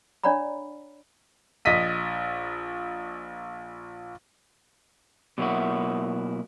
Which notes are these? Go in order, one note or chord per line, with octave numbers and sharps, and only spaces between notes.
D4 C#5 D5 F#5 A#5 B5
A#1 D#5 B6 D#7
B2 F#3 A#3 E4 F#4